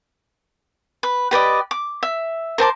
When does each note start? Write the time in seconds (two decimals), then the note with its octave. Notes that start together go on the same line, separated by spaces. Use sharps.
1.03 B4
1.31 G4 B4 D5 D#5
1.71 D6
2.03 E5
2.58 A#4 C5 A5 D6